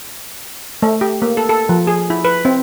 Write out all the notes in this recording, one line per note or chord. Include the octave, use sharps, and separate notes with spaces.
A3
G4
A#3
A4
A4
F3
G#4
E4
B4
C4